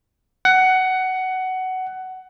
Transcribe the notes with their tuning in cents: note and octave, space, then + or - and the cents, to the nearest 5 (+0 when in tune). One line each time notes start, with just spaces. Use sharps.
F#5 +15